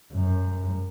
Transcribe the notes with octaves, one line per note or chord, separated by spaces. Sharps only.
F#2